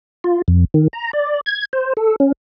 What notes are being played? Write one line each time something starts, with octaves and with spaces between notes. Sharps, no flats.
F4
F2
D#3
A#5
D5
G#6
C5
A4
C#4